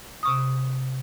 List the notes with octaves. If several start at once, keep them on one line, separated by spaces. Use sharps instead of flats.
C3 C#6 D#6